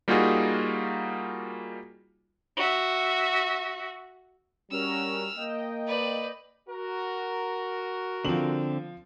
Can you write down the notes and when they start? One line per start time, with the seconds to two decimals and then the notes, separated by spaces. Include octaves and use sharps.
0.08 G3 A#3 D#4 F4 F#4 G#4
2.57 F#4 E5
4.71 G3 C#4 F#4 A#4 E6 F6
5.36 A#3 D#5 G5
5.87 B4 D5
6.69 F#4 A#4
8.25 D3 F3 C4 F#7